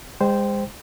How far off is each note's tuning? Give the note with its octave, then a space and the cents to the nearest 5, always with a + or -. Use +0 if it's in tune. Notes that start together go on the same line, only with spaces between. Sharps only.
G#3 -35 C5 -10 G5 +0